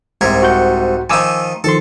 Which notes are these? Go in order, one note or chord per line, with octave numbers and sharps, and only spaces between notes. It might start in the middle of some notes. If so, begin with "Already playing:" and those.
C2 G#2 A#4 G#6
F#4 F#5 G6
D#3 F3 D#4 G#5 D6 E6
D#3 F3 A4 C6